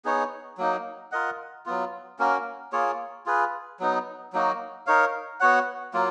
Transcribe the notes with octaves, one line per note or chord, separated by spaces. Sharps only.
B3 D#4 G#4 C#5
F#3 A#3 D#4
F4 A#4 D#5 F#5
F#3 B3 F4
A#3 C#4 F#4 A#4
A#3 F4 G#4 C#5
F4 G#4 B4
F#3 B3 D#4
F#3 A#3 D#4 F#4
D#4 A#4 C#5 F5
B3 F#4 C#5 F#5
F#3 A#3 F4